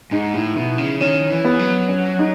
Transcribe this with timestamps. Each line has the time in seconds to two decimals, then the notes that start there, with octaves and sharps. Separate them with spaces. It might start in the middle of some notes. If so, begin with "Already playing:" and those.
0.11 G#2 D#4
0.34 A2 E4
0.56 B2 E4
0.78 C#3
1.01 D#3 C#4
1.31 E3
1.45 B3
1.59 F#3
1.89 C#4
2.19 D#4